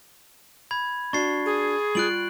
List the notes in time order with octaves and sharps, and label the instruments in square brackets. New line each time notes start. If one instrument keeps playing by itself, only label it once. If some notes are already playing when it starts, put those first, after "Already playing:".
[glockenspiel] B5 G#6
[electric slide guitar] D4 F#4 [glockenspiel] C#6 A6 C7
[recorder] G#4
[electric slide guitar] G3 F4 [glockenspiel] F#6 D7 F#7